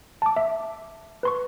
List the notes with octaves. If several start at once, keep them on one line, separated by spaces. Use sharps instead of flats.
A5 D6
E5
B4 C6 C#6